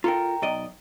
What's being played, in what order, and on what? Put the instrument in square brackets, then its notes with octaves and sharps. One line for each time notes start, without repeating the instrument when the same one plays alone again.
[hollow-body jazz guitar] F4 A4 A#4 [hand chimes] G5 A#5
[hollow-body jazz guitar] B1 D5 D#5